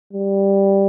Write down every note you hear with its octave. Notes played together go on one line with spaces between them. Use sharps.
G3